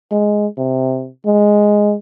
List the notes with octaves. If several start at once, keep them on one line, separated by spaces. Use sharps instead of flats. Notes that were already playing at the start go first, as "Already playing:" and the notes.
G#3
C3
G#3